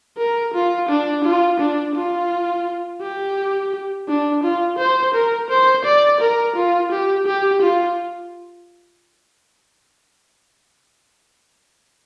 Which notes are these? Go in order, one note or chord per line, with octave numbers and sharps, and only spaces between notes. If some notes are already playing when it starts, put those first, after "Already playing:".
A#4
F4
D4
F4
D4
F4
G4
D4
F4
C5
A#4
C5
D5
A#4
F4
G4
G4
F4